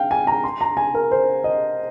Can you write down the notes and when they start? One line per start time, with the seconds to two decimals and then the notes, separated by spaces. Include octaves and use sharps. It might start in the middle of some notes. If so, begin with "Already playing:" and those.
Already playing: F5 G5
0.11 G#5
0.27 A#5
0.44 C6
0.61 A#5
0.77 G#5
0.94 A#4
1.11 C5
1.44 D#5